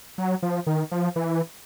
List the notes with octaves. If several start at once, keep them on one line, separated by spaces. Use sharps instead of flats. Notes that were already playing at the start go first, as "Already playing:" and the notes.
F#3
F3
D#3
F3
E3